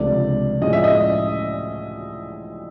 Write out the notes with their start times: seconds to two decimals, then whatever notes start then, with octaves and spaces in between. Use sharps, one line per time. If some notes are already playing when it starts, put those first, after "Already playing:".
Already playing: C#2 C3 F3 A3 D4 D5
0.61 A2 F3 G#3 C#4 F#4 D#5
0.73 E5
0.84 D#5